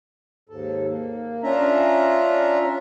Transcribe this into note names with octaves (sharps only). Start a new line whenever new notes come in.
D#2 G#2 A4
A#3
C#4 D4 F4 E5 A#5